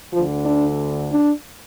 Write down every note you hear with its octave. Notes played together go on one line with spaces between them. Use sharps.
D2 D3 F3
D4
D4